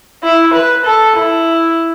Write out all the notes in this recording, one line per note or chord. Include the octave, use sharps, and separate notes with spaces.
E4
B4
A4
E4